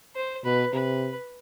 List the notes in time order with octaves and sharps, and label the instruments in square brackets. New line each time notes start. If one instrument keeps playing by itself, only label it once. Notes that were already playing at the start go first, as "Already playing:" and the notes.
[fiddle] C5
[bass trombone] B2 [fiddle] B4
[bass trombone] C3 [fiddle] B4